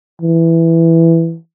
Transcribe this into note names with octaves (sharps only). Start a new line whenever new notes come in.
E3